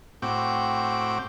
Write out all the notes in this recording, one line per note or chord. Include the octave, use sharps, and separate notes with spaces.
A2 C4 F#4 G5 D6